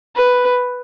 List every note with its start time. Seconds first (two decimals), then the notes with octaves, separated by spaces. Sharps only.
0.16 B4